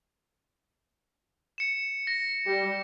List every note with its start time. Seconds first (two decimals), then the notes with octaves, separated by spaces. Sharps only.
1.58 C#7 E7
2.07 A#6
2.46 G3 G4